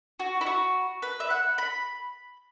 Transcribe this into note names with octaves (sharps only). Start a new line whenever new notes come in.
F#4
E4
F#4
B4
E5
F#5
B5